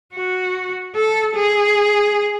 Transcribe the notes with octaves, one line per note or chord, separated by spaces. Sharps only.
F#4
A4
G#4